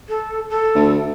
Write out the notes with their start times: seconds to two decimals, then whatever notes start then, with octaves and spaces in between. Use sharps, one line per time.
0.09 A4
0.50 A4
0.75 D2